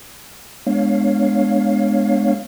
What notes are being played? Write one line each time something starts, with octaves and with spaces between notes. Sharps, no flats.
G#3 B3 D4 C#5 F5